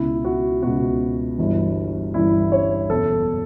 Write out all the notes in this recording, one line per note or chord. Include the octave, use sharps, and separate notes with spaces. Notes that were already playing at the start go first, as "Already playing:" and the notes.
Already playing: C#2 B2 E4
F#4
C#2 B2 F#4
G1 G2 E3
G1 G2 E3 E4
C#5
F#1 E2 B2 A4